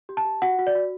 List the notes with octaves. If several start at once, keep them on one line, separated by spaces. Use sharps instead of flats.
G4
A5
G4
F#4 F#5
F#4
D5
F#4